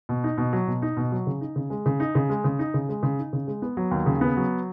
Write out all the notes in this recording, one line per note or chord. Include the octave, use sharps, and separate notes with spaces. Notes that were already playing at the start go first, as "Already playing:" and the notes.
B2
D#4
B2
F#3
B2
D#4
B2
F#3
C#3
D#4
C#3
G#3
C#3
D#4
C#3
G#3
C#3
D#4
C#3
G#3
C#3
D#4
C#3
G#3
B3
F#3
D#2
C#3
B3
F#3